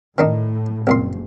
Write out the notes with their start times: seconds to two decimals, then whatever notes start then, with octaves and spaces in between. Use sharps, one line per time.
0.18 A2 D#3 D4 D#4
0.87 F#1 C2 A#2 C6